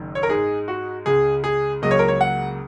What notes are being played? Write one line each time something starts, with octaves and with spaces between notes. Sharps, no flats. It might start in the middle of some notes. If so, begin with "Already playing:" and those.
Already playing: F#1 F#2 D#3
C#5
A#4
G#2 G#3 D#4 G#4
F#4
C#2 C#3 G#3 G#4
G#4
C#2 C#3 F#3 A#3 D#5
C#5
A#4
C#5
F#5